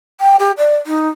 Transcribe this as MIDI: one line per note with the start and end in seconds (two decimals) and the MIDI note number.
0.20 0.36 79
0.39 0.52 67
0.57 0.75 74
0.86 1.08 63